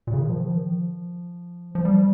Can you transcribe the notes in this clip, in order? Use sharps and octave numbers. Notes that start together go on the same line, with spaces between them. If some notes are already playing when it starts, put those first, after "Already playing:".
A#2
C#3
D#3
F3
D#3
F3
F3
G3